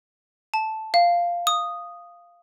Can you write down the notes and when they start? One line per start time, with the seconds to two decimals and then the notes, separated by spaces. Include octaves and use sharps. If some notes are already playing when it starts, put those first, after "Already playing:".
0.54 A5
0.94 F5
1.47 D#6